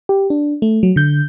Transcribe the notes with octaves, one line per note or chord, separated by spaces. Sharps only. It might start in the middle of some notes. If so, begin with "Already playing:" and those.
G4
D4
A3
F#3
D3 G6